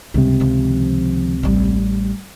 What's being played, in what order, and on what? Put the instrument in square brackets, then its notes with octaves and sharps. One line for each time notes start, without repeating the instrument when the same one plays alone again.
[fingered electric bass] C#2 C3 [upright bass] G2
[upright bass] D#3 F3
A1 G3